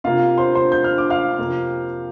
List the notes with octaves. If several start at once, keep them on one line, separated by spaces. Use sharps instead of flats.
C3 A#3 F4 F5
C5 C6
C5 C6
G6
F6
D6
F5 F6
F2 C3 F3 A#3